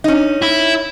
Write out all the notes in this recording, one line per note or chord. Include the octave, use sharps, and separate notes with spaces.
C#4 D#4
E4